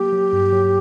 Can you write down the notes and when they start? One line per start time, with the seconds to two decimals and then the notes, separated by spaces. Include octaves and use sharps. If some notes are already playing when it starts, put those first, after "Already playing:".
Already playing: F#3 A#3 G4
0.12 F#3
0.33 G2
0.52 F#3